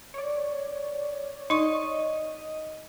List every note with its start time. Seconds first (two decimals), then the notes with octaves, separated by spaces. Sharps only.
0.14 C#5 D5
1.50 D#4 D#5 C#6